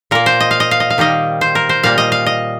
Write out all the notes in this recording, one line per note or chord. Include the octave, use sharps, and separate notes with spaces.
A#2 A#3 A#4
C5
D#5
F5
D#5
F5
D#5
F5
D#3 G3 A#3 D#5
C5
A#4
C5
A#2 G3 A#3 F5
D#5
F5
D#5